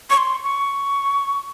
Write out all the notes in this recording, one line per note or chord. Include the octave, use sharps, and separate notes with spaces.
C#6
C6
C#6